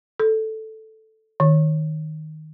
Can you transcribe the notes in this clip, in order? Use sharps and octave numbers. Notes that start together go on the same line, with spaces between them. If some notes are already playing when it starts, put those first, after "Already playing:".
A4
D#3